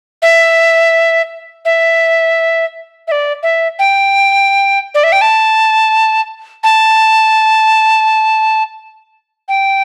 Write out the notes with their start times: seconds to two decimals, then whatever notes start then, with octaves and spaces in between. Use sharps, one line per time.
0.22 E5
1.65 E5
3.08 E5
3.12 D5
3.43 E5
3.79 G5
4.95 D5
5.04 E5
5.12 G5
5.21 A5
6.63 A5
9.48 G5